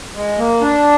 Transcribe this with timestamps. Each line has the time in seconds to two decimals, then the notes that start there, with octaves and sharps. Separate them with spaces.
0.15 G#3
0.39 A#3
0.61 D4